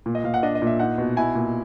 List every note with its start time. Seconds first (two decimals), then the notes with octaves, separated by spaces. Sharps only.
0.06 A#2
0.15 D#5
0.24 A#2 F5
0.34 F#5
0.43 D4 D#5
0.55 D#5
0.62 A#2 E5
0.79 D#4 F#5
0.98 B2
1.17 E4 G#5
1.35 A#2